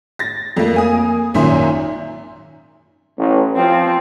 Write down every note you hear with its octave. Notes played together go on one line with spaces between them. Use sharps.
A6 A#6
F2 A3 A#3
A#3 G#5 D#6
G#1 F#2 A#2 D#3 E5 C6
A1
F3 C4